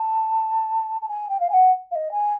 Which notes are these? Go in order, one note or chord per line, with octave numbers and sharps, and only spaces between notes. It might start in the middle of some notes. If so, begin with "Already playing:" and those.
Already playing: A5
A5
G#5
G5
F5
G#5
F#5
F5
D#5
G#5